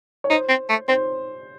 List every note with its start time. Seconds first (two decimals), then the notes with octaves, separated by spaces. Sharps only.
0.24 C#5
0.30 D#4 C5
0.49 C4
0.69 A3
0.88 C4 C5